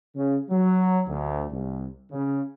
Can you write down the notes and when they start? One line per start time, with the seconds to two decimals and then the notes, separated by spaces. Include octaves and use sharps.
0.16 C#3
0.50 F#3
1.07 D2
1.51 C2
2.12 C#3